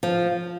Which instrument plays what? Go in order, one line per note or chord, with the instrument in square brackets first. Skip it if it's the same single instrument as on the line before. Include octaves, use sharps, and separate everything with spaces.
[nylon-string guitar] F3